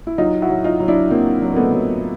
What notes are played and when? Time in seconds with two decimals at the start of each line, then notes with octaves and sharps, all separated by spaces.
0.07 E4
0.18 F#3 D#4 F4
0.42 E4 F#4
0.49 F#3
0.64 D#4 F4
0.80 F#3
0.88 D4 E4
1.11 F#3 A#3 C4
1.42 F#3
1.52 A#3
1.56 A3 B3
1.72 F#3